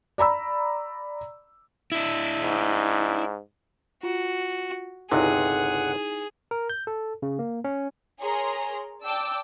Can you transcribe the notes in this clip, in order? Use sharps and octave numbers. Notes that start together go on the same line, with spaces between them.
D5 A#5 B5 E6
D4 E4
G#2
F4 F#4
G1 C#2 C3 D#4 E4 G#4 F#5
A#4
G6
A4
C#3
A#3
C#4
G#4 A#4 C#5 A#5 C6
D5 G5 A5 D6 E6